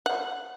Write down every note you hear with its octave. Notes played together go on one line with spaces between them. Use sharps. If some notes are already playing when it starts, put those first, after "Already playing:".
F#5